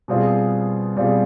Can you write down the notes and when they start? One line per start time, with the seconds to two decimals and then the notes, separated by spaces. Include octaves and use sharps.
0.08 B2 G3 C4 F4 G#4
0.95 B2 G3 C4 F4 G#4